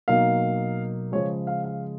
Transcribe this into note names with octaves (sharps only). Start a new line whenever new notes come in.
B2 F#3 A#3 D#4 F5
C#3 F3 G#3 C#5
F5
F5